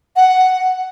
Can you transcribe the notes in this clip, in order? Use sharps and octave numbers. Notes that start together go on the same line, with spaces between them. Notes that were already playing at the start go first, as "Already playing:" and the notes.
F#5